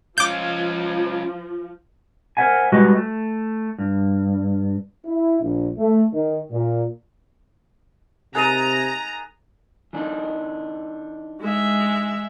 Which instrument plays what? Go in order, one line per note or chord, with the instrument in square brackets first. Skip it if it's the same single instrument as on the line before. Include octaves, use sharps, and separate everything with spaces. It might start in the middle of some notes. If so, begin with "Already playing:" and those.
[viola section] F3 [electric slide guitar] C#4 F4 [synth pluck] D6 G6
[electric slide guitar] A#4 C5 C#5 E5 F#5 G#5
G3 G#3 F#4 B4 D#5
A3
G2
[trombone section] E4
A#1
A3
D#3
A#2
[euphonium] C3 [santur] D#4 G#4 A#4 [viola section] A#5 [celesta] F#6 A6 D#7
[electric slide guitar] E3 D4 D#4
[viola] G#3 E5